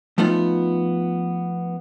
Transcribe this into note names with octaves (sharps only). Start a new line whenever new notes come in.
F3 A3 B3 D#4 F4